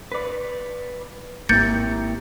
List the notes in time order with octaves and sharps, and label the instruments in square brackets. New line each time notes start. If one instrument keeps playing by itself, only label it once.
[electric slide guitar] B4 D5
[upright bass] G#1 [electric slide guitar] A#3 E4 G4 [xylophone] G6 A6 C#7